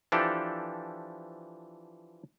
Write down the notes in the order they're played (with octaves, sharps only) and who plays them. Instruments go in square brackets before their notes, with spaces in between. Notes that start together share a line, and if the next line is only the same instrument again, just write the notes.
[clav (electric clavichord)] E3 F3 D4 G4 A4